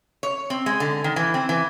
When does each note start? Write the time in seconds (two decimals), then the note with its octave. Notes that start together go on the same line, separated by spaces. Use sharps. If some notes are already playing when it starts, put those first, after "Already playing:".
0.23 C#5
0.50 C4
0.66 G#3
0.80 D3
1.04 D#3
1.16 E3
1.34 C4
1.49 E3